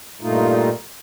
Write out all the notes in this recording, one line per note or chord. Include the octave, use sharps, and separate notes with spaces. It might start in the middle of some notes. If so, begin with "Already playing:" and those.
G2 A#2 A3 D#4 F4